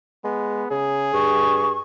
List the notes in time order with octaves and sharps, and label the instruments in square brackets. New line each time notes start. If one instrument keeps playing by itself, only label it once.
[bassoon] G#3 [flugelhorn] B3
[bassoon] C#3 [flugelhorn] G#4
[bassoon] G2 [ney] C#6